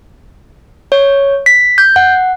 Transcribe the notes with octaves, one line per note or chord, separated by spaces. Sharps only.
C#5
B6
G6
F#5